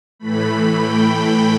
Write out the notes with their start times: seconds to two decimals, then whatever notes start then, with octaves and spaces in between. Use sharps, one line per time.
0.19 A2 E3 A3 B5
0.48 B5
0.76 G5